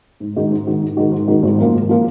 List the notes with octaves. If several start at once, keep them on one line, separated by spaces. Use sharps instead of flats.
G#2
D#3 G#3 D#4 F#4
G#2
D#3 G#3 D#4 F#4
G#2
D#3 G#3 D#4 F#4
G#2
D#3 G#3 D#4 F#4
G#1
F#2 F3 A#3 F4
G#1
F3 A#3 F4